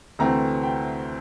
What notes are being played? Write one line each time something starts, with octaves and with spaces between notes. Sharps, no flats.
D2 C3 E3 A3 C4 A#5
G5